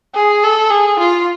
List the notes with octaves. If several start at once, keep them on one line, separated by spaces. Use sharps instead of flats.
G#4
A4
G#4
F4